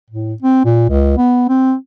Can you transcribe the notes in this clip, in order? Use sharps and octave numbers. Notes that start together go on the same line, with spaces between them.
A2
C4
A#2
C#2
B3
C4